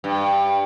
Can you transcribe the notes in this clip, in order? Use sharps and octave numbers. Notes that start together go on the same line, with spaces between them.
G2